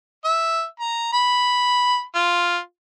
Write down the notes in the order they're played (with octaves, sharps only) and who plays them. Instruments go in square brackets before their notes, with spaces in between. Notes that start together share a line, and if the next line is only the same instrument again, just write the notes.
[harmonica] E5
A#5
B5
F4